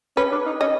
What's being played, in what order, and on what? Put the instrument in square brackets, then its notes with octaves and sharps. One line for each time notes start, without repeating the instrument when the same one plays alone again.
[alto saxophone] C#4 [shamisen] B4
[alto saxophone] D4
D#4
[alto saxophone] C#4 [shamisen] D#5